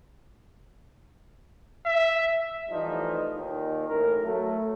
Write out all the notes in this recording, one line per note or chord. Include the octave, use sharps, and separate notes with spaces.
E5
E3 F3 G3 A3 D#4
D#2 A#2 D#3
A1 A#4
F#3 A3